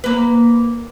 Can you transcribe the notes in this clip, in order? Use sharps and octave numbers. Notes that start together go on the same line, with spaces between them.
A#3 B4